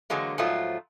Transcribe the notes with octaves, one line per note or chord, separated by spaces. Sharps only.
D3 E3 F#3 G#3 A#3
G#2 F3 F#3 A3 F4